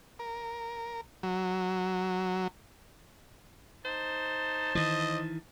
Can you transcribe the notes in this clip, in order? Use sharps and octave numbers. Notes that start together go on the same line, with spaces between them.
A#4
F#3
D#4 C5 A5
D#3 E3 D#5